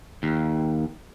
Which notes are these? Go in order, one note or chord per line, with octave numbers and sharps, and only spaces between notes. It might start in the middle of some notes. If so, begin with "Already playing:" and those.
D#2